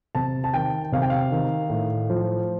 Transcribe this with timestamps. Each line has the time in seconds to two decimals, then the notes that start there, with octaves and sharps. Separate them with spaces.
0.15 C3 A5
0.44 A5
0.54 D#3 G5
0.92 C3 F5
1.02 G5
1.10 F5
1.32 D#3
1.70 A2
2.10 F3